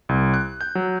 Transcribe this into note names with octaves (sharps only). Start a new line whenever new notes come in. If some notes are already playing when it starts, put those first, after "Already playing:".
C2
F#6
G6
F#3